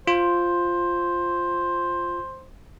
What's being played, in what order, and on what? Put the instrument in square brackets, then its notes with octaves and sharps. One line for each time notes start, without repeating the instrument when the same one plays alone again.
[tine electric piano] F4 [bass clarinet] C5